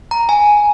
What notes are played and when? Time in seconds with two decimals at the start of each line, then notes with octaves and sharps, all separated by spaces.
0.11 A#5
0.29 G#5